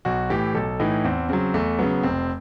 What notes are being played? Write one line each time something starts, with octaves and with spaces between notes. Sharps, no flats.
B1 F#4
A2 E3 G4
B1 A4
A2 E3 D#4
E2 C4
C#3 F#3 C4
E2 A3
C#3 F#3 B3
F1 C4